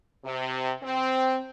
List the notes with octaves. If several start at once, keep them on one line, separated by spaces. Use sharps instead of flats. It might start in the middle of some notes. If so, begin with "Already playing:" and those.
C3
C4